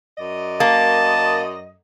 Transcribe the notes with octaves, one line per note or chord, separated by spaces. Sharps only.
F#2 D5 D#5
A#3 A5